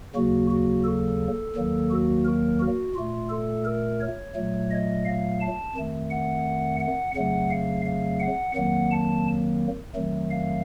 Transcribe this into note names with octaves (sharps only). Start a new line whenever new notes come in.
D#2 C#3 F#3 A#3 F#4
F#4
A4
D#2 D#3 F#3 A#3
F#4
A#4
F#4
A#2 A3 F4
A4
A#4
C#5
A#2 F#3 A3
D#5
F5
A5
F2 D#3 A3
F#5
F#5
F2 C#3 F#3 A3 F#5
F5
F5
F#5
F2 D#3 F#3 A#3 F#5
A5
F2 D#3 F#3 A3
F5